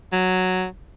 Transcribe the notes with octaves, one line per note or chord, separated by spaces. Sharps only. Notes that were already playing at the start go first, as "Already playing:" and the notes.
F#3